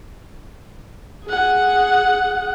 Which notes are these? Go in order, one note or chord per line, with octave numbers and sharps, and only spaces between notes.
G#4 F#5